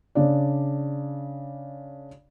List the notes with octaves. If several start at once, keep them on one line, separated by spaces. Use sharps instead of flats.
C#3 D4 D5